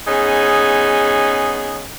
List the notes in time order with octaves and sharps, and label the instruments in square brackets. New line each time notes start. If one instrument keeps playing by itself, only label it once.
[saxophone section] B3 C#4 D#4 G#4